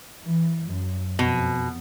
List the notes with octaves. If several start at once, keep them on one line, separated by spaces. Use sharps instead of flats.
E3
F#2
F2 B2